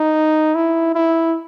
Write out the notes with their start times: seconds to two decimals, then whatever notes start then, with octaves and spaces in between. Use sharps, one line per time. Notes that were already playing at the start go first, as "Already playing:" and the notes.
Already playing: D#4
0.55 E4
0.95 E4